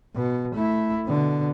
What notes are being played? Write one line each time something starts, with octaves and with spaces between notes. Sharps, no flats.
B2
A3 E4
B2 D3